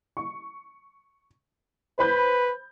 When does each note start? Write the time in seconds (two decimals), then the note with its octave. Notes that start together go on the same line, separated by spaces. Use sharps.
0.17 C#6
1.99 B4 C5 B5 G6